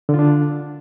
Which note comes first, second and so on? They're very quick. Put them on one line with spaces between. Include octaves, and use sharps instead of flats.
D3 F4 D4